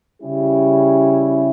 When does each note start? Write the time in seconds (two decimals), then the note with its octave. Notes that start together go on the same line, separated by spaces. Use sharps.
0.21 C#3 G3 C#4 E4 G4